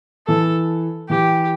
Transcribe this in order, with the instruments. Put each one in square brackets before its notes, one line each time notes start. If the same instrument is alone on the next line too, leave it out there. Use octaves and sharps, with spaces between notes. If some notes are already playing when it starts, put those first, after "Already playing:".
[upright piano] E3 [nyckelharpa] A4
[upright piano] E3 [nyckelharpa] G4